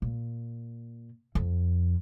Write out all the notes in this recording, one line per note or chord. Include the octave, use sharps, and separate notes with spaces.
A#2
F2